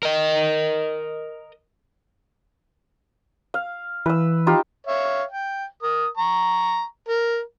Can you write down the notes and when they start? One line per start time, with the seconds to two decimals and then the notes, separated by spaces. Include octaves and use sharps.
0.03 A#4 D#5
3.54 F5
4.06 E3 B4 E6
4.47 D#4 F4 G4
4.87 C#5 E5 F5
5.30 G5
5.82 A#4 D#6
6.17 A#5 C#6
7.08 A#4